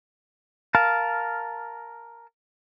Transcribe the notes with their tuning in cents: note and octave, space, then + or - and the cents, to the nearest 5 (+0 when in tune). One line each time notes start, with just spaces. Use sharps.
A#4 +0 F5 +0 A5 -10